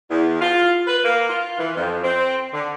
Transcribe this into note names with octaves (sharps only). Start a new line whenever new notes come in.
E2
F4
B4
A#3
F4
E3
F2
C4
D3